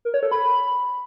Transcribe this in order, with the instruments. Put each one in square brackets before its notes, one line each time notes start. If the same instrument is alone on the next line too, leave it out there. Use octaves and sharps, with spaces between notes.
[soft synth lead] A#4
C#5
A4
B5